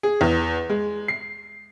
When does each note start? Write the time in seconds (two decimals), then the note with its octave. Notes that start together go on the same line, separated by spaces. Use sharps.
0.03 G#4
0.21 E2
0.70 G#3
1.08 C7